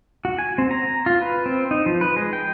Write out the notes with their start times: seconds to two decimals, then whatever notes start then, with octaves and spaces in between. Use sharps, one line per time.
0.25 F#4
0.39 G#5
0.58 C4
0.71 A#5
1.06 F4
1.21 B4
1.46 C4
1.71 D#4
1.86 F3
2.01 B4
2.16 G#3
2.33 G5